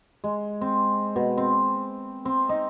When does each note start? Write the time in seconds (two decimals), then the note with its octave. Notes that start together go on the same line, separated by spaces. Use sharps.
0.24 G#3
0.61 C4
1.16 B2
1.37 C4
2.25 C4
2.49 D#4